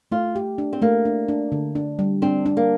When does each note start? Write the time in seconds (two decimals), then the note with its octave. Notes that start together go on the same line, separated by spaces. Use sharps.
0.12 A3 F4
0.36 G4
0.58 D4
0.73 C4
0.82 A3 A#3
1.05 D4
1.28 D4
1.52 D3
1.75 D4
1.99 G3
2.22 C4 D4
2.46 D4
2.57 A#3